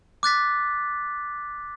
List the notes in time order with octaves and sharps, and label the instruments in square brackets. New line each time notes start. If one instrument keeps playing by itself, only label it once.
[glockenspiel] D6 F#6 A6 B6